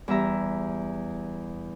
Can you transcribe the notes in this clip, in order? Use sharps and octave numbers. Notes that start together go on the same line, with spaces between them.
E2 G3 E5 A#5